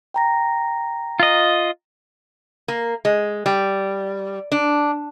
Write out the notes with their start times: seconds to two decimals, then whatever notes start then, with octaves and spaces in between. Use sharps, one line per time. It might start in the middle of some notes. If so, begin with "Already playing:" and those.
0.14 G5 A#5 A#6
1.20 F4 D#5
2.68 A#3
3.05 G#3
3.46 G3
4.52 D4